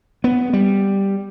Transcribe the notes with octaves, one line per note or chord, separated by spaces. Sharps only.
B3
G3